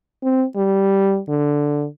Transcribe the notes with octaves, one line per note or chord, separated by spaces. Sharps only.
C4
G3
D3